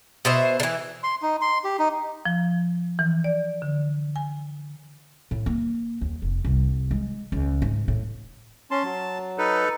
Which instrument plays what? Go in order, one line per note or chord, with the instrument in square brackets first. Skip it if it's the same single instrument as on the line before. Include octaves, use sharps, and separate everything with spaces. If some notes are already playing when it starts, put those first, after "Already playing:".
[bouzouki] B2 C5 E5
D3 E3
[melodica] C6
D#4
C6
G4
D#4
[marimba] F3
E3
D5
D3
G#5
[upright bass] A2
A#3
D#2
F1
C2
G#3
C#2
G#2
A2
[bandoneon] C#4 C6 [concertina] A5
[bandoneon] F#3
[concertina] D#4 A4 B4